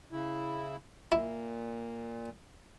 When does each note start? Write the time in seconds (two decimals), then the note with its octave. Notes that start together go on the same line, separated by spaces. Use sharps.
0.12 C#3 E4
1.12 A#2 E4